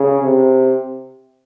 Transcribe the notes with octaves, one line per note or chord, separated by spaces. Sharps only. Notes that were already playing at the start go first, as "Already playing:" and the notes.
Already playing: C#3
C3